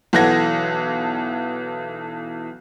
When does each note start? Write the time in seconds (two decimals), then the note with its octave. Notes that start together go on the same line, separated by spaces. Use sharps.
0.13 B1 E3 A4 F#5 G#6 A#6